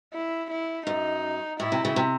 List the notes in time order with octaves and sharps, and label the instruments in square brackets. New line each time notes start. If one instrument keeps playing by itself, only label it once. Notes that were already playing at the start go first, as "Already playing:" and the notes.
[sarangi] E4
E4
[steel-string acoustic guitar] F#2 [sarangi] D#4
[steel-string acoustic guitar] A2 [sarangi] E4
[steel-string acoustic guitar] C3
C#3
C3